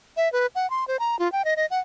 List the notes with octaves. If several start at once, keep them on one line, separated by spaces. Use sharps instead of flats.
E5
B4
F#5
C6
C5
A#5
F4
G5
D#5
D#5
F#5